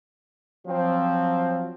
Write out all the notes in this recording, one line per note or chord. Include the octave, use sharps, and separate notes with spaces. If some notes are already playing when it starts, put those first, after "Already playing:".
F3 F#3 C4